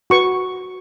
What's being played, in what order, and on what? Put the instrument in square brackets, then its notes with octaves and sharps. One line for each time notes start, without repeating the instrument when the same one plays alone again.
[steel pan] F#4 B4 C#6